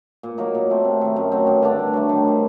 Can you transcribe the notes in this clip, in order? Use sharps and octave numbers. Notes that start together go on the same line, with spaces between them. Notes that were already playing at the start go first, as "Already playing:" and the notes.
A#2
F#3 A#3 D#4
A#2
A3 C4
C3
D#3 A3
F#2
F#3 C4 F#4
G2
D3 A3 D4
G2
F#3 A3
D#3
G3 C4